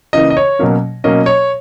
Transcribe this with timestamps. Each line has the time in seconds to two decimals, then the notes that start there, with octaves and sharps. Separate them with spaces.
0.13 C#3 E3 A#3 D#5
0.30 D#5
0.37 C#5
0.59 B2 F#3 A#3 C#4
1.04 B2 F#3 A#3 C#4 D#5
1.26 C#5